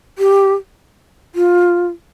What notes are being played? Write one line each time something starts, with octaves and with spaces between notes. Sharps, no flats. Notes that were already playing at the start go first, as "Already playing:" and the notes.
G4
F4